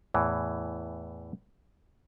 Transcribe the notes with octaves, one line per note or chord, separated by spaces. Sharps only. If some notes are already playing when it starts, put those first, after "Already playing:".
E2 A2 E3